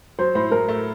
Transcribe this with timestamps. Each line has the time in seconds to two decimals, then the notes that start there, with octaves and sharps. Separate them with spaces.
0.19 F#3 C5
0.35 A2 C5
0.51 A2 A#4
0.69 A3